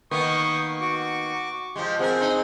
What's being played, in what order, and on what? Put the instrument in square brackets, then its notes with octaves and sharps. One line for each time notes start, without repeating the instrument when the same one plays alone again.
[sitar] D#3 A#3 B3 [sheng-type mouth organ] C#6 D#6
[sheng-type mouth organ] F#4 C#6 D6
[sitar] F3 G#3 [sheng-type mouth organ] G4
[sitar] F3 A#4 [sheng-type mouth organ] C4 G#4 F#5
[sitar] D#4